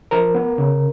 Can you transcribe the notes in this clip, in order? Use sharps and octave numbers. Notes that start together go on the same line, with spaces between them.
F3 A#4 A#5
B3
C#3